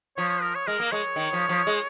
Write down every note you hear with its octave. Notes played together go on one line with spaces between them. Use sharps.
F3 C#5
C#5
A#4
C#5
G#3 A#4
A#3
G#3 C#5
D#3
F3
F3
G#3